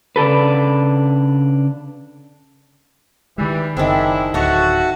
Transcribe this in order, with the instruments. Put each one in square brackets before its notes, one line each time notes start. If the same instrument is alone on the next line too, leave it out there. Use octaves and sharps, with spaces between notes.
[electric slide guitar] C#3 D4 A4 B4
[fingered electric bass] D#3 G#3 [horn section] E3 G3
[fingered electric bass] F#1 [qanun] D#3 C4 [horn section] D4 E4 [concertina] G#4
[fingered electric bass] D1 [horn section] F#4 [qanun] A4 C#5 D#5 [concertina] E5 F#5 A5